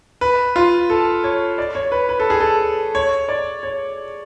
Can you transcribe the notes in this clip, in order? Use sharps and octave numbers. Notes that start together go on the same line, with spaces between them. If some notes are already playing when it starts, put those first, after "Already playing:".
B4
F4
A4
C#5
D5
C#5
B4
B4
A4
G#4
A4
C#5
D5
C#5